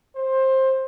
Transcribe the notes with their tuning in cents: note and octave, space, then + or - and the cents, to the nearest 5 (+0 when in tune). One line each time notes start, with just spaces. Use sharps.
C5 +15